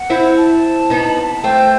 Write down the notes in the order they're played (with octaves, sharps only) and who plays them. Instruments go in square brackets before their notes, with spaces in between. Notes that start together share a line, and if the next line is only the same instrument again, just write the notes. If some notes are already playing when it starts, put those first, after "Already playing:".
Already playing: [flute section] F#5
[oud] C4 E4
[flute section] A5
[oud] B3 D#4
[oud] A3 C4 [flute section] G5